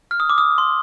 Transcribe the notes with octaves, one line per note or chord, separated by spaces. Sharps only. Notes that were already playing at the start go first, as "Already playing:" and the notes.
F6
D#6
D6
D#6
C6